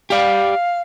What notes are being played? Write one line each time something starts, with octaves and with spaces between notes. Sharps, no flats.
G4 D5 F5